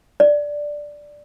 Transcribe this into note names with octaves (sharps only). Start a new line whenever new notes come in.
D5